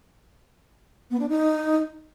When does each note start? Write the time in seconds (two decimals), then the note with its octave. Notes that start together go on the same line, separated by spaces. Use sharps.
1.10 B3
1.19 D4
1.29 D#4